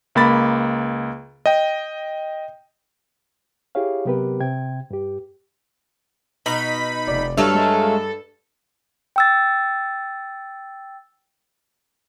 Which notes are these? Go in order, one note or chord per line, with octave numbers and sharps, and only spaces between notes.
C#2 A#3 B5 A6
D#5 G5
E4 G4 G#4 C#5 F5
C3 F#3 B3 G4 A#4 B4
C3 G5 G#6
G2 G4
B2 D#4 B5
F1 D5
G2 F#3 A3 A4 F5
G#3
G5 E6 A6